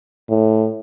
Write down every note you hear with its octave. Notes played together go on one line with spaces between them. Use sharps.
A2